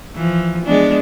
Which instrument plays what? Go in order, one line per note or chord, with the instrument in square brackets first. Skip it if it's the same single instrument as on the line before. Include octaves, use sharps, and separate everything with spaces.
[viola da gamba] E3 F3
G#3 B3 D4